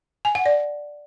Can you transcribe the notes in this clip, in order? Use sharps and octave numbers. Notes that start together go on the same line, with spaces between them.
G#5
F#5
D5